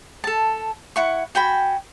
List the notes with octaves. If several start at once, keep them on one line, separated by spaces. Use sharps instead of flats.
A4 A5
E4 F#5 C#6
F#4 G5 G#5 B5